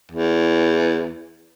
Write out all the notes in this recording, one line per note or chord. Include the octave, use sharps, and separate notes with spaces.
E2